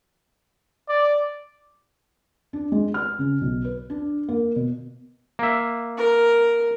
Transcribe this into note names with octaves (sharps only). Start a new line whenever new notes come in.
D5
D4
G#3
F6
C#3
B1
B4
D4
A#3
B2
A#3 E5
A#4